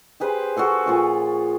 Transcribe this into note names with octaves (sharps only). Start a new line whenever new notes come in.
G4 G#4 B4 C5
F#4 G#4 A4 F5
A#2 F3 C#6